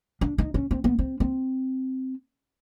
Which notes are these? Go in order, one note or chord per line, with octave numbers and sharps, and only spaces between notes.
D4
D#4
C#4
C4
B3
C4
C4